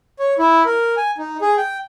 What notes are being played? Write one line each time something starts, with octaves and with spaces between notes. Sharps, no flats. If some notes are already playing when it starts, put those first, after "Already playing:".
C#5
E4
A#4
G#5
D#4
G#4
G5